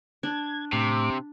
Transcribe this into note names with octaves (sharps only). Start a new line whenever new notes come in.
D4 G#6
A2 C3 D6